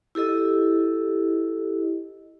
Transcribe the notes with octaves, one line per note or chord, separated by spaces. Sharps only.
E4 G4 A4 D#5